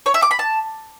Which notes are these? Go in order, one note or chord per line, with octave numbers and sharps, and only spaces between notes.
C#5
E5
D6
B5
A5